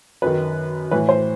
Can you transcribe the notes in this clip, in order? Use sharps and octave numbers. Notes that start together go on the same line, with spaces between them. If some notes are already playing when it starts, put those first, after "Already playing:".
F#2 D#3 B4
A2 E3 B4
C5